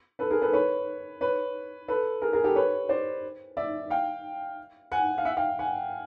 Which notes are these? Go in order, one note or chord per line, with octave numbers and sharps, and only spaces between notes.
A4 B4
G#4 A#4
A4 B4
B4 C#5
B4 C#5
A4 B4
G#4 A#4
G#4 A#4
G4 A4
B4 C#5
C5 D5
D5 E5
F5 G5
F#5 G#5
F5
E5 F#5
F5 G5
F#5 G#5